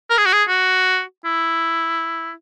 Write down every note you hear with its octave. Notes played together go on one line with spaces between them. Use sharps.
A#4
G#4
F#4
G#4
F#4
E4